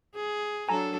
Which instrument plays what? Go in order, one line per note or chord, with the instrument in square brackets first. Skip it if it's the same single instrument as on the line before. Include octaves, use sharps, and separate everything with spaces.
[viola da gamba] G#4
[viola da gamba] F#3 D4 A4 [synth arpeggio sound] G#5 A#5